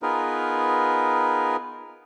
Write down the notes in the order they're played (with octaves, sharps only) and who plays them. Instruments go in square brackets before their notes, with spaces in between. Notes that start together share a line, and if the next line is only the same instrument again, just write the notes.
[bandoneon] B3 D#4 F4 G#4 A#4 B4